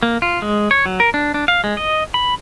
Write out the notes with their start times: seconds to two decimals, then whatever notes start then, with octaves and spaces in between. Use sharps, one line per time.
0.03 A#3
0.22 F4
0.42 G#3
0.71 C#5
0.86 F#3
1.00 A#4
1.14 D4
1.34 D4
1.48 F5
1.64 G#3
1.77 D#5
2.14 B5